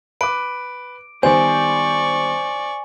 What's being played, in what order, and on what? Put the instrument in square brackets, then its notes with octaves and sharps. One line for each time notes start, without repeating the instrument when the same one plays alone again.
[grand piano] B4 D6 [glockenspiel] D7
[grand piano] D#3 G3 B3 [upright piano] C5 [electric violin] D5 C#6 [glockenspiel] G#5